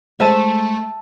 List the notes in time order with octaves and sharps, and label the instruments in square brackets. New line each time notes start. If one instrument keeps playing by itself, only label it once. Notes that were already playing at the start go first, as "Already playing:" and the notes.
[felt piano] G#3 C5 D#7 [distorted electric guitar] A3 [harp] E5 A5